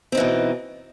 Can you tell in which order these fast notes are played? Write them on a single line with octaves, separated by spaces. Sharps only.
C4 D#4 E3 B2